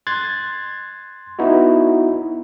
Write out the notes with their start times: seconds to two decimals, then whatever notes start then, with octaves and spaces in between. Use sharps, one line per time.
0.07 C6 F#6 G#6 A6
1.39 B3 D#4 E4 F#4